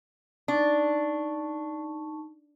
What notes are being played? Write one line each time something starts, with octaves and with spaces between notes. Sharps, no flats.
D4 D#4 A5 C#6